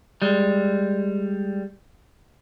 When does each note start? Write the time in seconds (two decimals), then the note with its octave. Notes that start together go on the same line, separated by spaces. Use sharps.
0.22 G3 G#3